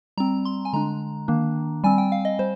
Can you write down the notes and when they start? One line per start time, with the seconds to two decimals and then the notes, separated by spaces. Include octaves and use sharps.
0.17 G3 C4 A#5
0.45 C6
0.65 G#5
0.73 D3 G#3 D4 A#5
1.28 D#3 A#3 D4
1.84 G3 C4 G#5
1.98 G5
2.12 F5
2.25 D#5
2.39 G3 C5